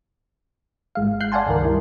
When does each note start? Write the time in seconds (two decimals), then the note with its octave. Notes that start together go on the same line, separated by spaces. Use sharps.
0.95 G#1 G#3 F5
1.20 F5 F#6 G6 C7
1.32 D5 F5 F#5 G#5 A5 C6
1.46 C#2 G2 D#3 A#4
1.62 G3 E4